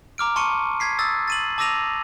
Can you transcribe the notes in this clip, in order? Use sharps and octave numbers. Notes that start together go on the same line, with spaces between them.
A#5 D6 F6 D7
A5 C6 C#6 C#7 D#7
G#6 B6 C7
D#6 E6 A6
A6 D#7 F#7
A5 D6 E6 A#6 D#7 F7